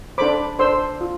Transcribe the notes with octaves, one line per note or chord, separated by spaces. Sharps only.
D4 A4 C5 B5 D6
D4 A4 C5 C6 E6
F4